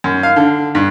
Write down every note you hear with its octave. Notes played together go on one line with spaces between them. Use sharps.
F#2
F5
D3
G2